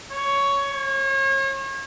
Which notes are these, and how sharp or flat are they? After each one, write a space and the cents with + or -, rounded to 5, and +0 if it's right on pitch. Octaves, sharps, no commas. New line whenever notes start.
C#5 +10
C#5 -35